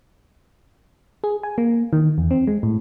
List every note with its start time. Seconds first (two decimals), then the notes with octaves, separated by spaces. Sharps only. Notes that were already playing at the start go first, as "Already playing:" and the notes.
1.24 G#4
1.43 G#5
1.58 A#3
1.93 D#3
2.18 E2
2.31 C4
2.47 G#3
2.63 A2